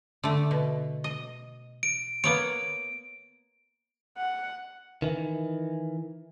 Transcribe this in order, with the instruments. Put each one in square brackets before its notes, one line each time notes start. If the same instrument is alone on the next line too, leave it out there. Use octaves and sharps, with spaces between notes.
[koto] D3 A3
B2
D#5
[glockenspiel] D7
[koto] A#3 B3 C#5 [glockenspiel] D7
[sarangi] F#5
[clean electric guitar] D#3 E3